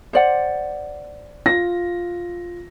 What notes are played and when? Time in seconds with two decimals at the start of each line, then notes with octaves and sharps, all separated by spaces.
0.13 C5 D5 F#5
1.46 F4 A#6